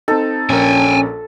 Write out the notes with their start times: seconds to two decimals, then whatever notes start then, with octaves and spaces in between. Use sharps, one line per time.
0.08 C4 D#4 A4
0.49 A#1 C#4 A#4 G5 G#5